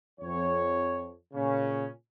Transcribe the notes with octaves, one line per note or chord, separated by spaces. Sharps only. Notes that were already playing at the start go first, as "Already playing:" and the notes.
F2 C#5
A#2 C#3 C#4